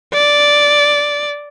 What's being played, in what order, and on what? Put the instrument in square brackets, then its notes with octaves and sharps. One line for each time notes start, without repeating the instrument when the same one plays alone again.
[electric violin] D5